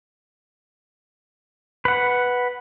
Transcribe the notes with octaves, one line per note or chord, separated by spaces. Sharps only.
B4 F#5